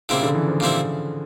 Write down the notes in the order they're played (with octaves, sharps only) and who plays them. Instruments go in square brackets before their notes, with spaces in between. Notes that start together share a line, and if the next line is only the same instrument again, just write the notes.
[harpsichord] A#2 G3 C4 E4 [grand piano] C#3
[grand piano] D3
E3
F3
[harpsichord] A#2 G3 C4 E4